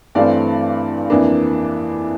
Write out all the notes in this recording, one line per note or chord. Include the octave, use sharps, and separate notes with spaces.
G2 E3 A3 C4 D5 F5
F2 E3 A#3 D4